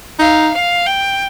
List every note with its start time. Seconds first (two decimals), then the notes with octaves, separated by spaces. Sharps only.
0.19 D#4 F5
0.54 F5
0.86 G5